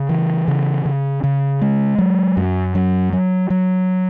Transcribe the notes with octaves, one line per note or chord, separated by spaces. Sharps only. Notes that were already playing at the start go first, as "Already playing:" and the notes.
Already playing: C#3
E3
C#3
C#3
C#3
G#3
F#3
F#2
F#3
F#3
F#3